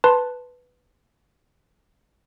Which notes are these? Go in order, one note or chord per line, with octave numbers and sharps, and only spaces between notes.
B4 A5 C6